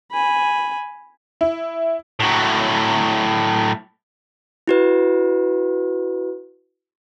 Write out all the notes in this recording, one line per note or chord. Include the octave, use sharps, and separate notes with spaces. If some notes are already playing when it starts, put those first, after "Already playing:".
G#5 B5
E4
A2 F#3
E4 F#4 B4